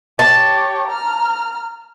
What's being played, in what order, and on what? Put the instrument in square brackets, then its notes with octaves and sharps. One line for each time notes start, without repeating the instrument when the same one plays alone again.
[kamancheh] G4 C#5 [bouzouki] A5
[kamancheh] A#5 F6